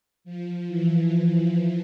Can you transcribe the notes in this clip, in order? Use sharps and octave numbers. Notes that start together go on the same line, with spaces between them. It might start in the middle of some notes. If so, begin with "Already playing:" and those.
F3
E3
F3